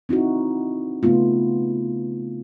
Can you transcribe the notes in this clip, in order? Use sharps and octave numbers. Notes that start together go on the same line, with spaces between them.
C4 D#4 E4 F#4
C#3 A3 B3 F4